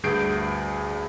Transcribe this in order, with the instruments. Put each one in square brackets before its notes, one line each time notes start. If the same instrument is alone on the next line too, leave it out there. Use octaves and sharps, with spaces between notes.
[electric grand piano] D2 G2 G#4 G6 C7 D7